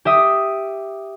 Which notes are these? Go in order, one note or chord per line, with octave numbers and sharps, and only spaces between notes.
G4 E5 D#6